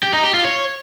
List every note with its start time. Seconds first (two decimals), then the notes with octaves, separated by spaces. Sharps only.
0.03 G4
0.13 D#4
0.24 G4
0.34 F4
0.45 C#5